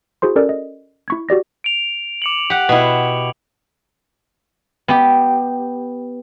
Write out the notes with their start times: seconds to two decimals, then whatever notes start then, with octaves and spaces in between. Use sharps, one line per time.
0.22 E4 F#4 G#4 C5 C6
0.36 C#4 A4 A#4 D5
0.49 D#5
1.08 E4 C#6 G#6
1.29 F#4 G4 D5 A#6
1.64 D7 F7
2.22 D6 C#7 F#7
2.50 G4 F#5
2.69 B2 E4
4.88 B3 G4